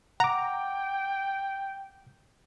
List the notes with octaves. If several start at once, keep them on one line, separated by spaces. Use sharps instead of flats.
F#5 G5 A#5 D6